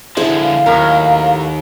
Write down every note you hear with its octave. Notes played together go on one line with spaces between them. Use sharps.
D3 F3 E4 G#4 C5
F5
D#2 A2 F#3 A#4